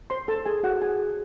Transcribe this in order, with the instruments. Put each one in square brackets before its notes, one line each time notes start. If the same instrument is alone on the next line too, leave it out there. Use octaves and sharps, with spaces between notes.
[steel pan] C5 C6
A4 A5
G#4 G#5
F#4 F#5
G#4 G#5